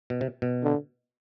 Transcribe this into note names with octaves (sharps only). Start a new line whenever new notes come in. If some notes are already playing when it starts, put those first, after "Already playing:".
B2
C3
B2
D3